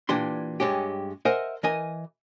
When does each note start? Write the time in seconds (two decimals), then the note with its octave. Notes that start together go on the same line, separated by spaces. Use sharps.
0.09 A#2 E3 D4 G4 C6
0.60 G2 G#3 C#4 G4
1.25 A#4 C5 D#5 E5 F#5 G#5
1.63 E3 A#4 D#5 G#5